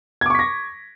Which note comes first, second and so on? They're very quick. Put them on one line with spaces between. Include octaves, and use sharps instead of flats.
G#6 D6 C#6 B6 A#6